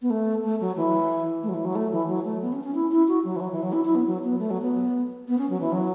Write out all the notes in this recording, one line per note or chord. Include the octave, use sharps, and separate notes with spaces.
B3
A3
A3
F#3
E3
A3
F#3
E3
F#3
A3
E3
F#3
A3
B3
C#4
C#4
E4
E4
F#4
F#3
E3
F#3
E3
F#3
E4
E4
B3
F#3
B3
A3
F#3
B3
B3
C#4
F#3
E3
F#3